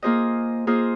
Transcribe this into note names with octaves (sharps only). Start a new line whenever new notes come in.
A#3 F4 G#4 C5 D#5
A#3 F4 G#4 C5 D#5